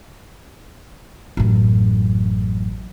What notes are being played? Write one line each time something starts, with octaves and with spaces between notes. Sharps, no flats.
A1 F#2